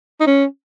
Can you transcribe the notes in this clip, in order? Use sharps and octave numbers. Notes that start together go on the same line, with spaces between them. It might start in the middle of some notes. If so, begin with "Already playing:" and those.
D#4
C#4